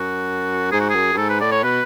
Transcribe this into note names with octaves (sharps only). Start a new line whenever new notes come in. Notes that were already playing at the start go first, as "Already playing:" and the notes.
Already playing: F#2 F#4
G#2 G#4
F#4
G#4
F#2
F#2
G#2 A4
B4
A2 D5
C#5
B2 B4